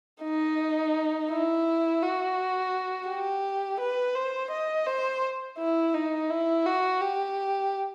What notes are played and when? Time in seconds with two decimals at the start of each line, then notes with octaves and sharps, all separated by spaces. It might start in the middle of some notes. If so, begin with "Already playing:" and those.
0.24 D#4
1.31 E4
2.03 F#4
3.09 G4
3.80 B4
4.15 C5
4.51 D#5
4.87 C5
5.58 E4
5.94 D#4
6.30 E4
6.66 F#4
7.01 G4